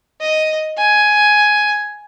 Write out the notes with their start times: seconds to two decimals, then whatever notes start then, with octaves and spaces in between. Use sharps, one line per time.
0.21 D#5
0.77 G#5